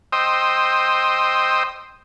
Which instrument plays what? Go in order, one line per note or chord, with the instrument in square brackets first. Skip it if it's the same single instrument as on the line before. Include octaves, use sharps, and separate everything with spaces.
[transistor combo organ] C5 D#5 G5 C6 D#6 E6